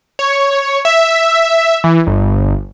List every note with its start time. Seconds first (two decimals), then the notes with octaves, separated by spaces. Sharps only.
0.19 C#5
0.85 E5
1.84 E3
2.07 G1